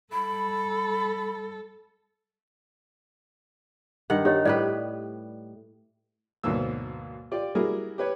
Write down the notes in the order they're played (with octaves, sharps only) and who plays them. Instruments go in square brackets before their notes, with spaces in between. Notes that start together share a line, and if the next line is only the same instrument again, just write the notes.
[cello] G3 A4 [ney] B5
[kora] G2 D#3 F#5
[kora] D#4 [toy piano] G4 C#5 D#5
[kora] A2 G3 B4 [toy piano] D5
[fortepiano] D2 G#2 B2 F#3 A#3 E6
F4 G4 D5
G3 E4 F#4 G#4 A#4
G4 B4 C#5